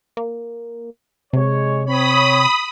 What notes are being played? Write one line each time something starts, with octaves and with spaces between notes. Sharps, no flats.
A#3
C3 G#3 C#5
C4 C#5 B5 D#6